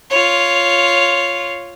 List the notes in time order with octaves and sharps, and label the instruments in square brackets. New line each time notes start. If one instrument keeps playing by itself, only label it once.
[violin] F4 C#5